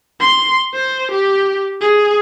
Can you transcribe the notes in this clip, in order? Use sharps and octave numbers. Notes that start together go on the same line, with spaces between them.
C6
C5
G4
G#4